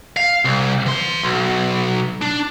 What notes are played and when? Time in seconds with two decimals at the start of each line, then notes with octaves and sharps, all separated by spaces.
0.17 F5
0.45 C2
0.86 E3 C6
1.23 B1
2.22 D4